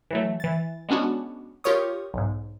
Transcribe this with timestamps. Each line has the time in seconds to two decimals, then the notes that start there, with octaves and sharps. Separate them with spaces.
0.11 E3 F#3 A3
0.40 E3 A6
0.89 G#3 B3 C#4 D4 F#4
1.64 F4 G4 A#4 C#5 C#6 D#6
2.14 B1 G#2